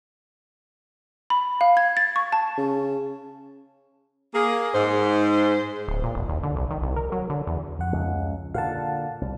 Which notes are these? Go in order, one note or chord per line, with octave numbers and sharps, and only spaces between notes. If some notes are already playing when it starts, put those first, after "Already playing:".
B5
F5
G#6
A6
C#6
A5
C#3
A#3 G#4
G#2 C5
D1
A#2
E1
D#2
D3
C2
D#3
C2
A#4
F#3
D3
E2
F2 F#5
C#2
A#2 D3 F5 F#5 A5
C2